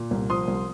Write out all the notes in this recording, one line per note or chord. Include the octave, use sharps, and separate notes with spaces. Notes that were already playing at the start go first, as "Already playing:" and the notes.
Already playing: A#2
C2
F3 C6 D#6
C2